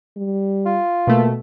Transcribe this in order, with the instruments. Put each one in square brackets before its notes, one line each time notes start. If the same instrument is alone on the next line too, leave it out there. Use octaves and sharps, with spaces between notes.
[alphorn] G3
[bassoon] F4
[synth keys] B2 A3 [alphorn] A#3